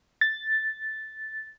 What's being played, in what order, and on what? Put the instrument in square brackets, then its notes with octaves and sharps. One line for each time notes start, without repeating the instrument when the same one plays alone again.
[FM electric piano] A6